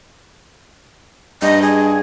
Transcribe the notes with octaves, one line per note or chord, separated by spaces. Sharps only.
G2 D#5
G#4